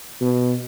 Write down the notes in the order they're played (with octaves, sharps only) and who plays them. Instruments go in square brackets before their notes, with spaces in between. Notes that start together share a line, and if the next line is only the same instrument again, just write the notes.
[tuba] B2